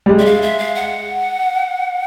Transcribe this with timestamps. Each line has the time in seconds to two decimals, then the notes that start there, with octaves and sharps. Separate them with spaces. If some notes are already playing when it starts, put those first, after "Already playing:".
0.06 G3
0.09 G#3
0.19 E5
0.26 F5
0.42 E5
0.58 F5
0.75 F#5